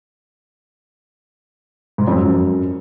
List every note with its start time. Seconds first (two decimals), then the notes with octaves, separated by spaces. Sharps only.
1.98 G#2
2.07 F2
2.17 F#2